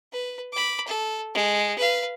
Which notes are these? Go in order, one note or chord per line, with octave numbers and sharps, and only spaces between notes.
B4
B5 D6
A4
G#3
B4 F5